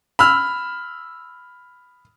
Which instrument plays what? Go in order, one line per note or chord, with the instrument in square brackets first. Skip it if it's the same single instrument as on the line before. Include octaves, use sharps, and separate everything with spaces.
[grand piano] B5 E6 F6